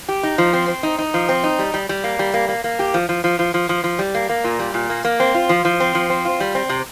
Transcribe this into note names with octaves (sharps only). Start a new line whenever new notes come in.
G4
D#4
F3
C4
C4
D#4
D#4
F3
C4
D#4
G3
G3
G3
A#3
G3
A#3
A#3
A#3
G4
F3
F3
F3
F3
F3
F3
F3
G3
A#3
A#3
A#2
G3
A#2
A#3
A#3
C4
F4
F3
F3
C4
F3
C4
F4
G3
C4
C3